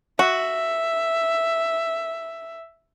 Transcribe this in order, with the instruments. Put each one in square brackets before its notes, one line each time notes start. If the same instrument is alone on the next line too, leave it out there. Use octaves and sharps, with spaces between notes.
[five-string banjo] F#4 [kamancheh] E5